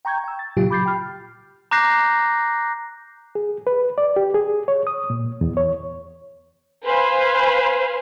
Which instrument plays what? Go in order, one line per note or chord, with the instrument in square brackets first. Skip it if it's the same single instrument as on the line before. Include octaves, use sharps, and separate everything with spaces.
[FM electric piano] G5 A#5 C#6 G6 G#6
G5 E6
A6
A#2 C#3 F#3 F4 G4
B5 D6 G6 A6 C7
G5 B5 F6
[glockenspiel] A#5 D6 F#6 G6 A#6 C7
[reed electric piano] G#4
B4
D5
G4
G#4
C#5
D#6
A#2
E2
C#5
[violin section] B4 C5 F5 G#5